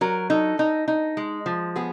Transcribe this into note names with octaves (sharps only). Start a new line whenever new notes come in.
F#3 A#4
D#4 A4
D#4
D#4
G#3
F3
B3 G#4